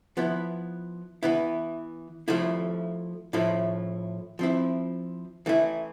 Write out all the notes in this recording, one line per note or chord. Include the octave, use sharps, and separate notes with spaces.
F3 B3 E4
E3 B3 E4
F3 A3 E4
A2 F3 A3 E4
F3 C4 E4
E3 A3 E4